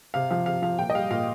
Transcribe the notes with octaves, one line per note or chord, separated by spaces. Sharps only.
C3 F5
F3 F5
C3 F5
F3 F5
A#2 G5
D#5
G3 F5
A#2 F5